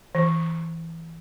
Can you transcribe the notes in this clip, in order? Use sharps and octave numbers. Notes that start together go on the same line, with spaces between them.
E3